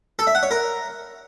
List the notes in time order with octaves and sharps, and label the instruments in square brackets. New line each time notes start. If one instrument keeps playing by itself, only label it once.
[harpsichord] A4
E5
F#5
C#5
A#4